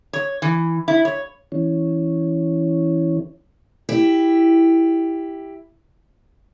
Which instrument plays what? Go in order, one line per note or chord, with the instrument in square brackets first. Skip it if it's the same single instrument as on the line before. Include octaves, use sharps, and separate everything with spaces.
[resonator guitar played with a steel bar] C#5
E3
E4
C#5
[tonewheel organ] E3 C#4
[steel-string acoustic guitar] E4 G4